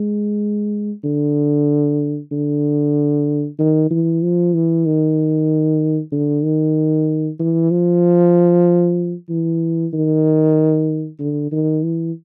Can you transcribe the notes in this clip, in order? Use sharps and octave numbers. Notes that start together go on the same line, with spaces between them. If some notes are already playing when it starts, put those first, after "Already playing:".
Already playing: G#3
D3
D3
D#3
E3
F3
E3
D#3
D3
D#3
E3
F3
E3
D#3
D3
D#3
E3